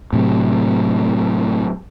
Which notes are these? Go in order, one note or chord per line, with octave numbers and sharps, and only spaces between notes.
A2 C3 F#3